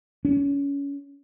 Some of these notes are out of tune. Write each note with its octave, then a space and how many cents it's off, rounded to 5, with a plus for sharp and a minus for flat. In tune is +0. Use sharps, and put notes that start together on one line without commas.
C#4 +25